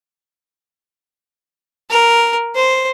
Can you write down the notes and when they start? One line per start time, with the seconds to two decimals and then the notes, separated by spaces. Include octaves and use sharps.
1.90 A#4
2.56 C5